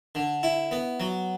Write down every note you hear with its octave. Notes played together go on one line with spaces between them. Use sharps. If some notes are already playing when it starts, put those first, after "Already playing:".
D3
E4
B3
F#3